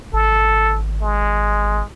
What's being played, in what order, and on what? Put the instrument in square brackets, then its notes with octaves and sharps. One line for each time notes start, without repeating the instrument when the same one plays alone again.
[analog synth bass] G#1 [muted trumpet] A4
[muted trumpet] G#3